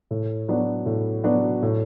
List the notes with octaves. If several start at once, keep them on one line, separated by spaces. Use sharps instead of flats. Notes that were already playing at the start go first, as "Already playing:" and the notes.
A2
F#3 B3 D4 F#4
A2
F#3 B3 D4 F#4
A2